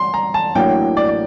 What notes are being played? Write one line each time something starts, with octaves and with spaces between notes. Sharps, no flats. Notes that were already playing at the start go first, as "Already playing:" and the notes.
Already playing: C6
A#5
A5
A1 A2 F#3 A#3 D4 G5
D5
D5